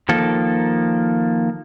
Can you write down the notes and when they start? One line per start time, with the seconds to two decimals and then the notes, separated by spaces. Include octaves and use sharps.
0.09 D#3 F3 A#3 A4